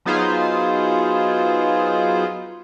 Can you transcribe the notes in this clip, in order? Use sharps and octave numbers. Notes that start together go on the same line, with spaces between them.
F#3 B3 D#4 F4 G#4 C5